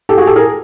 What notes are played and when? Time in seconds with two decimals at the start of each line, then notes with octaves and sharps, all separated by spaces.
0.09 G4 A4
0.17 F#4 G#4
0.26 G4 A4
0.36 G#4 A#4